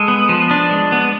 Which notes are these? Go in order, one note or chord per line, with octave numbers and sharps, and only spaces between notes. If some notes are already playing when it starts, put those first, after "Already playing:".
Already playing: G#3 A4
B3
F3
D4
G#3
B3